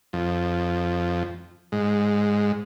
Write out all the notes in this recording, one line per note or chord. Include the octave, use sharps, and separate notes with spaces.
F2
G#2